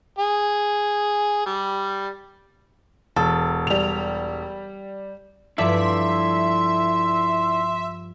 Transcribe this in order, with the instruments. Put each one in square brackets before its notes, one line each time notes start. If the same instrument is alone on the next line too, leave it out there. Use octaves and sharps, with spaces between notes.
[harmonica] G#4
G3
[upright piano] E1 [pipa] A4
[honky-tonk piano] G3 F7
[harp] G2 F3 [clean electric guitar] E4 A4 D5 [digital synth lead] E5 [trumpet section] C6